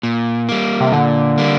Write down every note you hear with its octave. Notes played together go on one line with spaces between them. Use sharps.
A#2
G3 A#3
C3
A#2 D3
G3 A#3